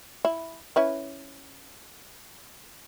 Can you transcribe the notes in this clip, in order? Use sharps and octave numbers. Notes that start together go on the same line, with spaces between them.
E4
C#4 E4 B4